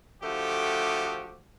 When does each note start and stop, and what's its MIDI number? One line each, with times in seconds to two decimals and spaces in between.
0.22 1.40 50
0.22 1.40 53
0.22 1.40 57
0.22 1.40 66
0.22 1.40 67